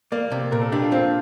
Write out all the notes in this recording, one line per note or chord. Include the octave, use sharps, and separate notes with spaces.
A#3 D5
C3
A#2 A#4
A4
D4 G4
F4
C4 F4